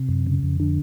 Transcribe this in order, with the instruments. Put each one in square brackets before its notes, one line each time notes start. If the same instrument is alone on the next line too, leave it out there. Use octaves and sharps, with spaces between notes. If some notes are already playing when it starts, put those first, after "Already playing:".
Already playing: [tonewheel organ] C3
F#2
C#3
F2
D3